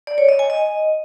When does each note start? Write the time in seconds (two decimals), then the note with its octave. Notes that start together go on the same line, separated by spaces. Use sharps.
0.07 D5
0.18 C#5
0.29 D#5
0.39 G#5
0.50 D#5